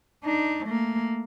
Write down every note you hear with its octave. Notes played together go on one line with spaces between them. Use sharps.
D4 D#4
A3 A#3